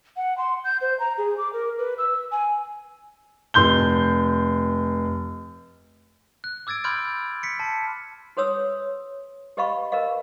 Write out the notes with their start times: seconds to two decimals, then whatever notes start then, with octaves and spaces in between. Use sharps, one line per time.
0.17 F#5
0.38 C6
0.64 G6
0.81 C5
1.00 A#5
1.18 G#4
1.38 D6
1.53 A#4
1.79 B4
1.98 E6
2.32 G#5
3.54 F1 C6 G6 G7
6.44 F#6
6.67 D6 E6 G#6 A6 D7
6.84 B5 C6 F6 G6 G#6 D7
7.43 B6 C#7
7.60 A5
8.37 F#4 B4 C#5 D#6 E6
9.57 G4 B4 D#5 F5 B5 C#6
9.92 A#4 B4 D#5 F5